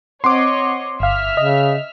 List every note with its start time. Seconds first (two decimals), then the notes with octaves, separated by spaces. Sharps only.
0.24 C4 C#5 D#5 F#5 C6 D6 C7
1.00 G1 E5 F5 F6
1.37 C#3 D#5